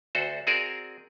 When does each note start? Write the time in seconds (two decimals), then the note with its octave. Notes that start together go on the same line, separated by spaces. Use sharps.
0.15 D2 F#4 A4 C5
0.47 C4 F#4 G#4 A#4 D5